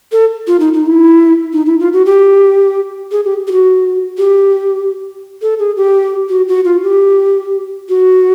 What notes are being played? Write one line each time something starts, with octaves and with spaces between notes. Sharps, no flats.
A4
F4
D#4
D#4
E4
D#4
E4
F4
F#4
G4
G#4
G4
G4
F#4
G4
A4
G#4
G4
F#4
F#4
F4
G4
F#4